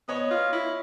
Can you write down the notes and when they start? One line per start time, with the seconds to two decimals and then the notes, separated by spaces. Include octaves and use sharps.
0.08 B3 C#5 D#5
0.31 F4
0.53 E4